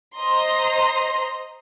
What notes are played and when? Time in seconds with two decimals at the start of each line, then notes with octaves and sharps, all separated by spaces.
0.17 C5 D#5 A#5 C6